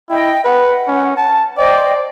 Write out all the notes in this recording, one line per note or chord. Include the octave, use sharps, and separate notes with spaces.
E4 D#5 G5
B4 F#5
C#4
A5
C5 D5 D#5 G5